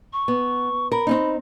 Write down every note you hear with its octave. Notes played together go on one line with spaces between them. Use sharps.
C#6
B3
A#4 B5
C4 C#4 D#4